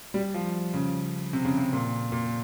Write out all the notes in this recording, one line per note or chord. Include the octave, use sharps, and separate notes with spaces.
G3
F3
C#3
C3
C#3
C3
A#2
A#2